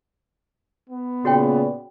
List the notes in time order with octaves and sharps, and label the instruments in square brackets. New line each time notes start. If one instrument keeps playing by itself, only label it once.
[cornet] B3
[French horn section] A#2 C#3 D5 [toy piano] F#4 C#5 G5